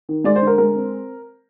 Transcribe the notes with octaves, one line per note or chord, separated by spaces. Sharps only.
D#3
G#3 D5
C5
D3 A#4
G#3 A#4
C4